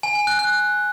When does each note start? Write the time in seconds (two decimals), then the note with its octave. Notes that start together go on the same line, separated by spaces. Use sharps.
0.03 G#5
0.15 G#5
0.27 F#6
0.39 F#6